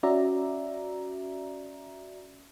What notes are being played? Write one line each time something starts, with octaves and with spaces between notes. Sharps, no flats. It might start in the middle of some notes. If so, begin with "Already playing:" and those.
C#4 F#4 D5 E5 A#5